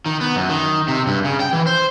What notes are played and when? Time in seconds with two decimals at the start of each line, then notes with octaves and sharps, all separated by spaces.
0.06 D#3
0.21 B3
0.36 F#2
0.50 D#3
0.88 C3
1.07 G2
1.25 C#3
1.40 G5
1.53 E3
1.67 C5